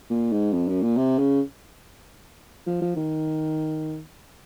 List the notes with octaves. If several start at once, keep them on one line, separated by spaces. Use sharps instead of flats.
A#2
G#2
F2
F#2
A#2
C3
C#3
F3
F3
D#3